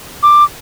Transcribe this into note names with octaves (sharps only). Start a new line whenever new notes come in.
D6